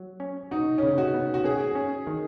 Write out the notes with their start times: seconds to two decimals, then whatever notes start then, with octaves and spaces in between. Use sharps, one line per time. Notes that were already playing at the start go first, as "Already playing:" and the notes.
Already playing: F#3
0.20 C#4
0.51 D#4 F#4
0.78 C#3 C#4
0.89 D#4
0.98 F#4
1.14 B3
1.34 F#4
1.44 C#4 G#4
1.75 C#4
2.07 D#3